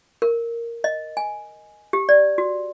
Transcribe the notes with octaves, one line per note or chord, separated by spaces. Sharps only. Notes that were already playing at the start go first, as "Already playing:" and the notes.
A#4
D#5
G#5
G4
D5
F#4